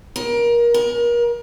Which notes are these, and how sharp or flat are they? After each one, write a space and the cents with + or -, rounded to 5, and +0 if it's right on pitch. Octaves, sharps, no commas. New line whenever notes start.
A#4 +25
A#4 +35